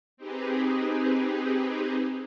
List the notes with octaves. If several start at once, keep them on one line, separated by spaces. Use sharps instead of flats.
C4 D#4 G4 G#4 B4